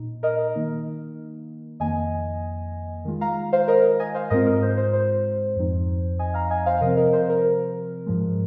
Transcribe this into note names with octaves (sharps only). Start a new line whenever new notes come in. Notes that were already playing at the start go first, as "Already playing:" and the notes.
Already playing: A#2 D#4
A#4 D#5
D#3 A#3 D#4
F2 D#3 A#3 D#5 G#5
D#3 G#3 F4
F5 A#5
C5 F5
A#4 D#5
D#5 G#5
C5 F5
G#2 G#3 C4 F4 A#4 D#5
A#4 D#5
C5
C5
C5
F2 F3 C4 D#4
D#5 G#5
F5 A#5
D#5 G#5
C5 F5
C3 F3 C4 A#4 D#5
A#4 D#5
C5
A#4
G#2 F3 G#3